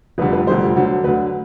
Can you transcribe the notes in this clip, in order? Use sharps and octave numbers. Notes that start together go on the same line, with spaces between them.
F1 F2 D3 G3 B4
B4
F1 F2 D3 G3 C5
D2 D3 F#3
D2 D3 F#3 B4